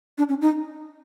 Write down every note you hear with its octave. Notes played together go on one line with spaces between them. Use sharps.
D4
C#4
D#4